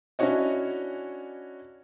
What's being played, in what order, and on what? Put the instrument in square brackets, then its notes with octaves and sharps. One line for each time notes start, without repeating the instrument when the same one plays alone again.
[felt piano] C#4 D4 E4 F#4 C#5 D#5